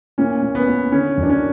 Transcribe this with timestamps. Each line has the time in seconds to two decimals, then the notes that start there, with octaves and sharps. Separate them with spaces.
0.18 A#2 C#4
0.42 A#2
0.55 B3
0.68 A#2
0.92 D3 C#4
1.17 F#2
1.23 D4
1.30 C#4